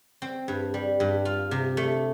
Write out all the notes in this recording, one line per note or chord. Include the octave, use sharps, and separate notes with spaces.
C4
G2
G3
G2
F4
C3
A3